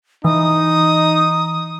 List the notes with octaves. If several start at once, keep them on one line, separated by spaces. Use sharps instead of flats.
E3 D#4 D#6